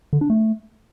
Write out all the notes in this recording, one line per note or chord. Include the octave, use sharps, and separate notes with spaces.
D3
D4
A3